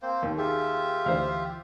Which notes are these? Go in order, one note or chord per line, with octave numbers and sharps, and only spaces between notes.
A#3 C4 C5
D#2
F4 G4 G#4 E5
D2 E3 C5 F5